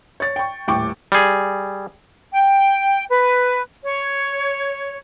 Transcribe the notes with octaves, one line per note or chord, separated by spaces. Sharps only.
C#5 A6
G5 C#6
D#1 A2 G5 C#6 D6
G3 G#4
G5
B4
C#5